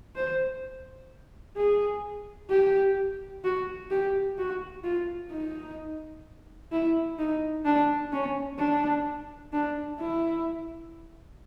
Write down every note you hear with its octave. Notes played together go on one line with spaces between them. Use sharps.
C5
G#4
G4
F#4
G4
F#4
F4
D#4
E4
D#4
D4
C#4
D4
D4
E4